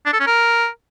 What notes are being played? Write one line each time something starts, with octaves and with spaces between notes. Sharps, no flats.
D4
A4
C#4
A#4